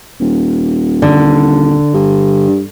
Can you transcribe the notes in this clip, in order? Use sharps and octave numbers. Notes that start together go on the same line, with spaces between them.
D#1
D3
G2